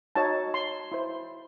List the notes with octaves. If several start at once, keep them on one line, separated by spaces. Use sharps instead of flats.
D#4 F#4 C#5 A5
C6
E4 C5